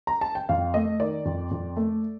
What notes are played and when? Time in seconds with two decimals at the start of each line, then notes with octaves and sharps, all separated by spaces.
0.07 A#5
0.21 A5
0.35 G5
0.49 F2 F5
0.74 A3 D#5
1.00 D#3 D5
1.25 F2
1.51 F2
1.77 A3